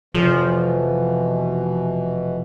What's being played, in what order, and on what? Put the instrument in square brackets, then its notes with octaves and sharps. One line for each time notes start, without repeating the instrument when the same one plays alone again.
[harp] F1 [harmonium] B2 E3 [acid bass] F3